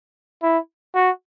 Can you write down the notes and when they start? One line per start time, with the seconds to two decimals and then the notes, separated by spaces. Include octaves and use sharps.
0.43 E4
0.95 F#4